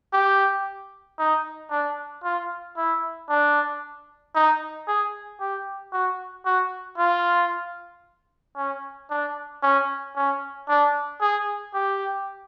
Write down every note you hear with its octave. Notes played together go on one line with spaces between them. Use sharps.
G4
D#4
D4
F4
E4
D4
D#4
G#4
G4
F#4
F#4
F4
C#4
D4
C#4
C#4
D4
G#4
G4